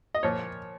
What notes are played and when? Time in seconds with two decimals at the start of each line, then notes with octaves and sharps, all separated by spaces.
0.15 D#5
0.23 A#2 F3 C#5